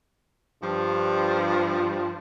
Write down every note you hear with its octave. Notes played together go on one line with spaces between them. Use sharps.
G2 F3